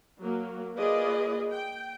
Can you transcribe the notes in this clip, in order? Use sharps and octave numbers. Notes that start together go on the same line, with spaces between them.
F#3 A#3
A#3 F4 G#4 B4 D5 D#5
G5